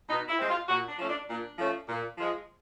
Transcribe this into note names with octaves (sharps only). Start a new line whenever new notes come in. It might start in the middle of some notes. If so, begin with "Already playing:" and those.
B2 D#4
E4
G#3 C4
F4
A#2 F#4
D4
F3 A3 C#4
D4
A#2 D4
F3 A3 C#4
A#2
F3 G#3